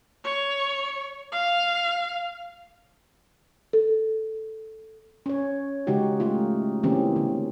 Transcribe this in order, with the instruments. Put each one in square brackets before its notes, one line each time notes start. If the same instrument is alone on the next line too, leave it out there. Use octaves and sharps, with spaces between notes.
[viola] C#5
F5
[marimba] A4
[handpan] C#4 C#5
C#3 G#3 D#4 F#4 G4
A3 D#4 F4
C#3 E3 A#3 C4 C#4 G4
D3